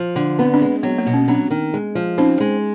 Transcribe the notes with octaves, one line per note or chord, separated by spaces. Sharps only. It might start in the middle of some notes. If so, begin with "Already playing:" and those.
Already playing: F3
D3
B3 C4
C4 D4
G#3
F#3 B3
A#3
B2
C#4
F#3 C4 D4
D#3
G#3
F3
C4 C#4 D#4
G#3